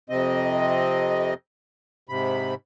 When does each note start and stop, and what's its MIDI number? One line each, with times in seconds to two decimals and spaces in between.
0.10 1.34 41
0.10 1.34 48
0.10 1.34 60
0.10 1.34 75
2.09 2.54 44
2.09 2.54 48
2.09 2.54 83